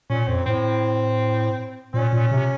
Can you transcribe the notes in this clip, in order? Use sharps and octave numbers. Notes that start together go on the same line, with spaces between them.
A#2 C#4
F2 C4
A2 C4
A#2 C#4
A#2
C3